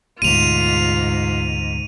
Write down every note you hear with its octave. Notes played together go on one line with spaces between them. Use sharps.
D2 G#2 B2 F4 D#7 F7